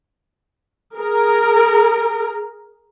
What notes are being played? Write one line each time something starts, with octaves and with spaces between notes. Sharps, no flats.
G#4 A#4